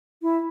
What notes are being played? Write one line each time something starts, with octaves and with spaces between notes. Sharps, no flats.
E4